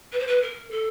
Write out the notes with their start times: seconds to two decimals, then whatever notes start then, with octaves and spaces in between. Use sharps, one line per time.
0.12 B4
0.19 C5
0.27 B4
0.41 A#4
0.70 A4